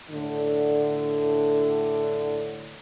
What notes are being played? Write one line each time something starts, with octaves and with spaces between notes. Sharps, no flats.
A2 D3